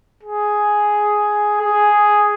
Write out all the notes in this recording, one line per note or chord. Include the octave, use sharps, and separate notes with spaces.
G#4
G#4